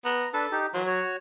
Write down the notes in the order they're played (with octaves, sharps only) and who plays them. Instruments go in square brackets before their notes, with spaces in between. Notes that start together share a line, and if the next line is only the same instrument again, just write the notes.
[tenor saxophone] B3 [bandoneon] A#5
[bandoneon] D4 B4 [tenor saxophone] A4
[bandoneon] D#4 G4
[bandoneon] E3 C6 [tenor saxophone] F#3
[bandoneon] F#4 C#5